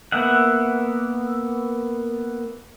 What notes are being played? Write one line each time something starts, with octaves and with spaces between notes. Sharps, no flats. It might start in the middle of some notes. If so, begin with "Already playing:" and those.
A#3 B3 E5 F#5